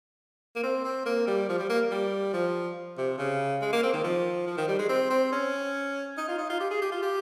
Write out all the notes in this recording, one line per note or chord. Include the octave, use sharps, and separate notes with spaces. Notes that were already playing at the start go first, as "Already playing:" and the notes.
A#3
C4
C4
A#3
G3
F3
G3
A#3
G3
F3
C3
C#3
G#3
A#3
C4
D#3
F3
F3
D#3
G3
G#3
C4
C4
C#4
D#4
F4
D#4
F4
G4
G#4
G4
F4
G4